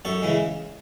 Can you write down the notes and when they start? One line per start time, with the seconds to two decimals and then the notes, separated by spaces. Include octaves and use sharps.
0.05 F#2 A4 C#5
0.22 C#3 E3 G#3